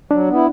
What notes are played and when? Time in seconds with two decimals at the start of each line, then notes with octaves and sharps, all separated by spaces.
0.11 F#3 D4
0.28 B3
0.33 E4